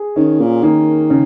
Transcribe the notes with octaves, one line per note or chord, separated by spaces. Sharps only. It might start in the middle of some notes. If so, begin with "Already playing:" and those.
Already playing: G#4
D#3 C#4
A#2
D#3 A#3
C#3